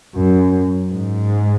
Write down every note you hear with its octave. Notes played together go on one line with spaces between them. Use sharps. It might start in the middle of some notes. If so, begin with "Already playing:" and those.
F#2
G#2